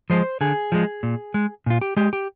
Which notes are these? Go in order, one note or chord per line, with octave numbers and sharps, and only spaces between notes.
F3 G#3 C5
D3 G#4
F3 G#3
A#2
G#3
A#2 F4
G4
G#3 G4
G4